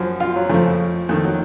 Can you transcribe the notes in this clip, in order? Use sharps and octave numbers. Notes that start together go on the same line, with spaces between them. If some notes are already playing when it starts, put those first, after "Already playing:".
Already playing: F#2 F3
F4
F#3
F2 C#3 F3 A3
F2 D#3 A3
F#3